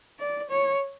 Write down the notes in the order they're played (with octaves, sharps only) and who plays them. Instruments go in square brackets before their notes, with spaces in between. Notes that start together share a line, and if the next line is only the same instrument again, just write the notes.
[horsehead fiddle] D5
C#5